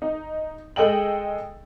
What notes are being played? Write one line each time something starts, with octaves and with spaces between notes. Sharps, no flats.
D#4
G#3 A4 D#5 G5 F#7